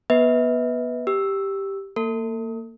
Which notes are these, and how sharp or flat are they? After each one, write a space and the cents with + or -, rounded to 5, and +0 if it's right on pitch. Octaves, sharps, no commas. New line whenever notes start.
B3 -25 B4 +0 E5 -40
G4 +0 E6 +0
A#3 -20 A4 +35